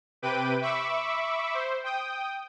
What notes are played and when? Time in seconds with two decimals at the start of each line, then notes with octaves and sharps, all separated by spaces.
0.22 C3 B4 G5 D6 D#7
0.61 E5 B5 C#6 D6 E6
1.54 C5
1.84 G5 D#6